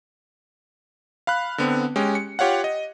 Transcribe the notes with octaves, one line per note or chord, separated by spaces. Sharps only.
F5 B5 F#6
D3 B3 C4
G#3 C#4 G4
C#7
F4 G4 C#5 F5 F#5
D#5